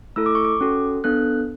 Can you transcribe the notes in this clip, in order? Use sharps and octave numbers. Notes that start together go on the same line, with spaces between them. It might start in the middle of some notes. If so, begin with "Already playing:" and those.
A3 E4 A4 E6
D6
C#6
D6
C#4 F#4 A4
B3 D4 A4 F#6